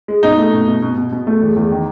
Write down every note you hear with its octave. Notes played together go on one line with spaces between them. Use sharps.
G#3
B2 D#4
A3
B2
B2
B2
B2
B2
A3
E2
E2
D#3